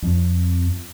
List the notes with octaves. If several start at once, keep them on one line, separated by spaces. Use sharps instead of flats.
F2